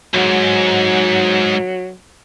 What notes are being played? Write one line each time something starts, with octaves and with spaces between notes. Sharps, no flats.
C#2 G#2 F#3